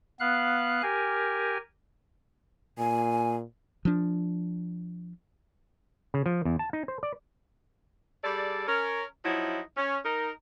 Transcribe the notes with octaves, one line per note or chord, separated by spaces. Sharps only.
B3 F5 F#6
G4 A#4 G#5
A#2 G#5
F3 D4
C#3
F3
E2
A5
D#4
C5
D5
G3 G#4 A4 D5
C#4 A#4
F3 F#3 D#4 E4
C#4
D#4 A#4